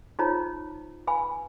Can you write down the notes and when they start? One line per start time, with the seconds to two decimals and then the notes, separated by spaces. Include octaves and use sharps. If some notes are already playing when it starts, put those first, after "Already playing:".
0.19 D#4 F4 C5 C#5 A#5
1.07 B4 F5 G#5 B5